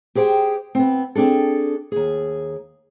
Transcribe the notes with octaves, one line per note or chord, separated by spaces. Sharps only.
G4 G#4 C5 F#5 G5
B3 C4
C4 D4 G#4 A4
D#2 G#4